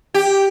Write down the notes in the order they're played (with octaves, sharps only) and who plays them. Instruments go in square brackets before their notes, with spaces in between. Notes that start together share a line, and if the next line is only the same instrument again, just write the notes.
[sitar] G4